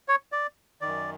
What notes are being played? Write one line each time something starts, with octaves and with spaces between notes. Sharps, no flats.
C#5
D5
F#2 D#3 D5